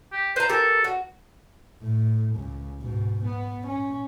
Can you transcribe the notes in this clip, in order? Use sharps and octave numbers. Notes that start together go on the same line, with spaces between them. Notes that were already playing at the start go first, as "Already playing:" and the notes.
G4
B4 C5 A#5
G4 A4 A#4
F#4
A2
C#2
G#2 B2
B3
C#4